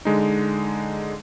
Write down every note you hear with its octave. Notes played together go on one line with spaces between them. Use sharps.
D3 G#3 D#4